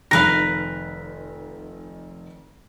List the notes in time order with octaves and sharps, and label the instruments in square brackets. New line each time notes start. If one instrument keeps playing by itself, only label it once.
[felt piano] F1 D#3 A#6 [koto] A#4 B4 F5